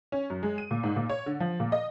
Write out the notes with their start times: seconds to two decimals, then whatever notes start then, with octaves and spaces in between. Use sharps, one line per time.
0.12 C#4
0.30 F#2
0.43 G#3
0.58 D#7
0.71 A#2
0.83 G#2
0.96 A#2
1.09 C#5
1.26 D3
1.40 F3
1.60 A#2
1.72 D#5